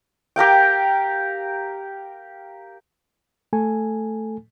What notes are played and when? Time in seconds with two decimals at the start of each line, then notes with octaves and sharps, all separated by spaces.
0.36 G4 A#4 F5 G5
3.53 A3 A4 G#5